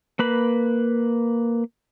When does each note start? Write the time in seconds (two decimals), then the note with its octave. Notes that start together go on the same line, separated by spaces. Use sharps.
0.19 A#3 B4 B5